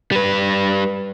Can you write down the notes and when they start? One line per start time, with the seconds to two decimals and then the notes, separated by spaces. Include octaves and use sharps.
0.12 G3 B4